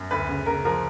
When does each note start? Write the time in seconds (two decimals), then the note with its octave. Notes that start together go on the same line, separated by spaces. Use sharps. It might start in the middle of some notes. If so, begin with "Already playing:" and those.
Already playing: F#2
0.11 D2 B4
0.29 C#3
0.46 C#3 A#4
0.65 F3 A#4